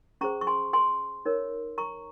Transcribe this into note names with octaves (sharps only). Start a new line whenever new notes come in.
C#4 G#4 C5 A#5 C#6
C#6
G#5 C6
G#5 C6
D#4 A#4 C#5
A#5 C#6